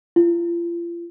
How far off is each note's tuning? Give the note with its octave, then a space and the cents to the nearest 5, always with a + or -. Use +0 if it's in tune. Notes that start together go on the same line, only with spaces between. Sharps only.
F4 -35